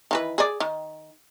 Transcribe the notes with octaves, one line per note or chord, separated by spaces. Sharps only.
D#3 E3 B4
G#4 D5
D#3